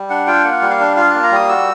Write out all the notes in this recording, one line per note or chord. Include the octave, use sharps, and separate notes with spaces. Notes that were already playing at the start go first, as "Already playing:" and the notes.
Already playing: G3
D4 F#5
F4 G5
A#3 F#5
G3
F5
D4
F4 F5
A#3 A5
A#5
G3 D#6
F#4 E6